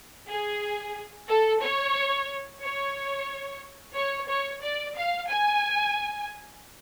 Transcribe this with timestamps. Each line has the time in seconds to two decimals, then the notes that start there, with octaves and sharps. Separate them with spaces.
0.28 G#4
1.28 A4
1.61 C#5
2.62 C#5
3.95 C#5
4.28 C#5
4.62 D5
4.96 F5
5.29 G#5